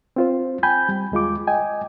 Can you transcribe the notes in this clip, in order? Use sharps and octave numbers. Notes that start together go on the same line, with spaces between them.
C4 F4 C5
G5 G#5 B5 G6
G3
D#2 G#3 F4 D6
D#5 G5 G#5